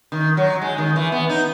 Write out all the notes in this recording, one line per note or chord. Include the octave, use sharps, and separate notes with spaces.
D#3
F#3
G#3
D#3
E3
B3
D#4